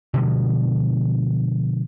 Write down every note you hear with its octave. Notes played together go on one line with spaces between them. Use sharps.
B2 D3 F3 G#3